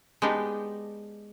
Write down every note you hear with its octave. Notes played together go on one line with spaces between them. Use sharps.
G#3 B3 D4 D#4 G4